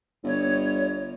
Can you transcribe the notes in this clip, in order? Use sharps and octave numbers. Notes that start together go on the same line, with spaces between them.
G1 C#5